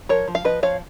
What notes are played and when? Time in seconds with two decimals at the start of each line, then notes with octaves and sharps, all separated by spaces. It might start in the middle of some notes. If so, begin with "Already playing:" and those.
0.09 F3 A#4 C#5
0.28 F3
0.35 F5
0.45 F3 B4 D#5
0.63 F3 C#5 F5